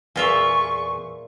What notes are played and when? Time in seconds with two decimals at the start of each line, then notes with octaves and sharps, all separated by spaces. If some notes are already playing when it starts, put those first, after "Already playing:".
0.16 E2 A#2 F4 G#4 E5 C#6